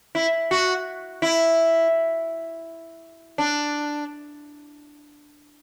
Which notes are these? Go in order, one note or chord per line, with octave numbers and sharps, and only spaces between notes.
E4
F#4
E4
D4